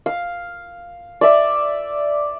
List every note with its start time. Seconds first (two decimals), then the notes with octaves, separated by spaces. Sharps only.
0.06 F5
1.21 D5 E5